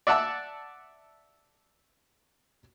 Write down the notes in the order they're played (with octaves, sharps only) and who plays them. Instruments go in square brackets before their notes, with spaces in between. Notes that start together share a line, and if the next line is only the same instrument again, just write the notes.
[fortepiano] D5 E5 F#5 A5 D6 E6